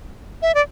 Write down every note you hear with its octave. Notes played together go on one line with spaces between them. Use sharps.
E5
D5